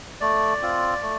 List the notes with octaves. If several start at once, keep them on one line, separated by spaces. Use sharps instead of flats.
A3 D5
C4 F4
A3